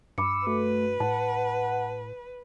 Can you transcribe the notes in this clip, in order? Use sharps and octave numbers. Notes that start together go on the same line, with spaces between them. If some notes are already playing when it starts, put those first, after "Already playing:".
G2 B5 D6 E6 C#7
A3 F#4 B4
A2 F#5 A5